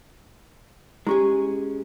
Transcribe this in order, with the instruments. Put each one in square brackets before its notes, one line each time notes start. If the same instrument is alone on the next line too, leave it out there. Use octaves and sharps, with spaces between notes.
[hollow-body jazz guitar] G#3 C#4 G#4 [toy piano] E4 G4